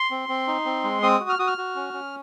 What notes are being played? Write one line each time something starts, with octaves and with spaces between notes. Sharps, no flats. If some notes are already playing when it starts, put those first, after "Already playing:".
Already playing: C6
C4
C4
D#4
C4
G#3
C4 D#6
F#4
F6
F#4 D#6
F6
F#4
C#4
C#4